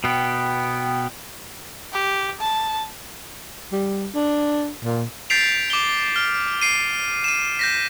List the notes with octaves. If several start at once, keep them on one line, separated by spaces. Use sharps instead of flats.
B2 B3 G5
G4
A5
G3
D4
A#2
G6 A6 B6 C7 D7 F7
D6 G7
F6
C7 D7 D#7
D#7 E7
G6 A#6 B6